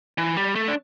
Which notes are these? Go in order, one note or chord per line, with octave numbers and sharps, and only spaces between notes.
E3
G3
A3
D4